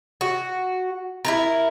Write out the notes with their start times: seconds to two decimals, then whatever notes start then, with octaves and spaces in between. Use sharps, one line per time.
0.21 F#4
1.25 E4 F4 A#4